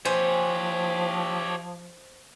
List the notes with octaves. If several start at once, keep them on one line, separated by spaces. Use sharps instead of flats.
F3 G4 C5 C#5 G#5